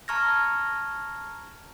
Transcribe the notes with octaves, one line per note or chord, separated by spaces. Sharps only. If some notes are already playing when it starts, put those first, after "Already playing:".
A5 A#5 C#6 F6 G#6 A#6